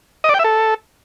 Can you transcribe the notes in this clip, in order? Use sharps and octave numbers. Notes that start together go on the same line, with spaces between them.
D#5
D5
G5
E5
A4